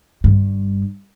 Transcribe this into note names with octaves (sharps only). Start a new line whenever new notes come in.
G1 G2